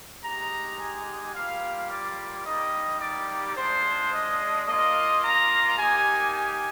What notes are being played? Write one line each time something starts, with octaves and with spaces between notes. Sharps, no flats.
G#3 D#4 G4 A#5
G#5
G3 A#3 F4 F5
D5
G3 A#3 D#4 G4 D#5
D5
G#3 D4 F4 C5
D#5
A#3 F4 D#5
A#5
A#3 D#4 G4 G#5
G#5